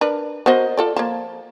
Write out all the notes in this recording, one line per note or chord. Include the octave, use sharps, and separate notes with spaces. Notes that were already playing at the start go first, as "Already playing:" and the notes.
D4 A#4 B4
B3 F#4 A#4 C5 D#5
F4 A4 D5
F3 A#3 A5